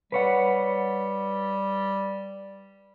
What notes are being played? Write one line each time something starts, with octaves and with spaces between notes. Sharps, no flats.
G3 B4 C#5 F#5